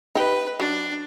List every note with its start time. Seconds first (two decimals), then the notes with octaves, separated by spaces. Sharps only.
0.15 D#4 G4 B4
0.60 F#3 D4